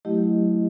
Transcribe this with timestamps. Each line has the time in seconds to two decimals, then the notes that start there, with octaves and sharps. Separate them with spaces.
0.05 F#3 A3 E4 G4 D#5